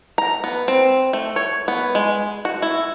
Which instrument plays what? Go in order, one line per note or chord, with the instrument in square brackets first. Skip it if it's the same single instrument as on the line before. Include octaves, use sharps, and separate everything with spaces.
[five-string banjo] A#5
B3
C4
A3
C#5
B3
G#3
F#4
E4